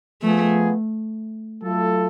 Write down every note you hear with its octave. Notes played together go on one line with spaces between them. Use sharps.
F3 A3 B3 F4 G#4
F#3 A3 F4 A4